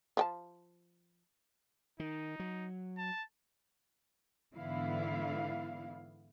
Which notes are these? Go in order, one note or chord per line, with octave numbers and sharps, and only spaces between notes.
F3 G5 A5
D#3 D#4
F#3
A5
G#2 D3 E3 B3 E4 F5